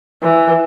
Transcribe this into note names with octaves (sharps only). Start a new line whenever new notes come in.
E3